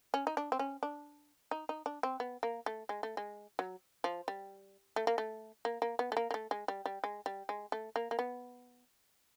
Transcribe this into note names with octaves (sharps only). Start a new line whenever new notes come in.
C#4
D#4
D4
C4
C#4
D4
D#4
D#4
D4
C4
B3
A#3
A3
G#3
A3
G#3
F#3
F3
G3
A3
A#3
A3
A#3
A#3
B3
A3
A#3
A#3
A3
G#3
G3
G3
G#3
G3
G#3
A3
A#3
A#3
B3